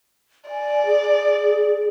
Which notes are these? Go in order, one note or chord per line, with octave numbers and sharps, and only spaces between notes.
D5 G#5
G#4